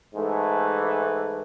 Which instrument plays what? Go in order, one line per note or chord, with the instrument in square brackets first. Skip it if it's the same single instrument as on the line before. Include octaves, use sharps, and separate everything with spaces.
[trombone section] G#2 E3 A3